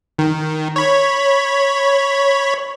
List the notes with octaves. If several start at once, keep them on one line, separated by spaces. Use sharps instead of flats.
D#3
C#5 B5